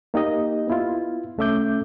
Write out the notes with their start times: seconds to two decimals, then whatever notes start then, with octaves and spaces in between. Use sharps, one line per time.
0.14 A#3 D#4 G4 D#5
0.67 B3 E4 F4
1.38 C2 A3 C#4 E5 D6 G6